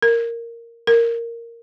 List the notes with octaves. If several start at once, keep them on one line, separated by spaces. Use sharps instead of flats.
A#4
A#4